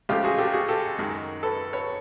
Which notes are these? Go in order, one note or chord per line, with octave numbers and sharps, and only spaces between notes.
C#2 C#3 F3 A3 F4 G4
F#4 G#4
G4 A4
F#4 G#4
G4 A4
F#2 D#3 G#3
A4 B4
B4 C#5